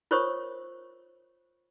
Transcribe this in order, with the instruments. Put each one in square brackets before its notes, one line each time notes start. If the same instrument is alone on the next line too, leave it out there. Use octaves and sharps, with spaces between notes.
[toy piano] F4 A#4 C5 C#5 C#6 D#6